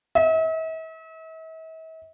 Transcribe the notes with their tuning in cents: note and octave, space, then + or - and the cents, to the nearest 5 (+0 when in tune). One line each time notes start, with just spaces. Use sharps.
E5 -45